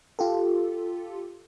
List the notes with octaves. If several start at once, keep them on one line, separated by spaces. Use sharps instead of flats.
F4 G4 A4